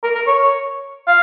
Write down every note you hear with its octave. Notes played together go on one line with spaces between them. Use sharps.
A#4
A#4
C#5
F5